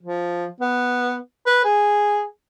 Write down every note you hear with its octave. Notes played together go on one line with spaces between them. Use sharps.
F3
B3
B4
G#4